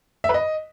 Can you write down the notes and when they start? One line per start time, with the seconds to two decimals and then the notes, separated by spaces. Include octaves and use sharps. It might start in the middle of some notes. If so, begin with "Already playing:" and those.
0.24 E5
0.29 B4
0.34 D#5